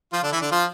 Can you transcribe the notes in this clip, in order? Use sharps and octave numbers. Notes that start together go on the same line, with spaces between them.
F3 F4
D3 D4
E3 E4
D3 D4
F3 F4